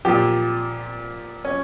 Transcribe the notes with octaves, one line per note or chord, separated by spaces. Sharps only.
A#2 F3 G4
C#4